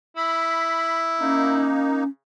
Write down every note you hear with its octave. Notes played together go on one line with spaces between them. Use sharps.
E4 B5
A#3 C#4 D#4